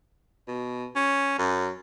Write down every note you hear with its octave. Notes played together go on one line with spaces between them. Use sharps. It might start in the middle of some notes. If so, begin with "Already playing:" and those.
B2
C#4
F#2